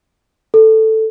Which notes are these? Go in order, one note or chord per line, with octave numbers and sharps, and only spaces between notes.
A4